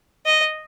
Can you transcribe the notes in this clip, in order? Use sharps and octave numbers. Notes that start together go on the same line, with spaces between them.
D#5